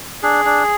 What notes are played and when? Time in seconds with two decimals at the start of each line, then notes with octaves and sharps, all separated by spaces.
0.23 D4 G#4
0.45 D4